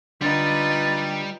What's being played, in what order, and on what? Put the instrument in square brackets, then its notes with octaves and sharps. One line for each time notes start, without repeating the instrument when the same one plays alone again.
[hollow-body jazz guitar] D3 [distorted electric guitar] G3 [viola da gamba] D#4 F4 B4 [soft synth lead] A6